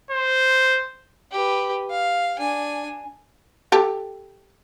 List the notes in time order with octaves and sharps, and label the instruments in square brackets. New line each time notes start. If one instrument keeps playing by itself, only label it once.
[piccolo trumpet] C5
[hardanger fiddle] G4 B4
F5
D4 G#5
[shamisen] G4 A4